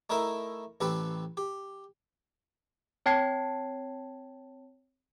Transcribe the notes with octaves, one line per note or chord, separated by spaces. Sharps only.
A3 D#4 E4 A#4 E5
A1 C4 G4 A4 B4
G4
C4 C#5 G5 A5 G#6 C7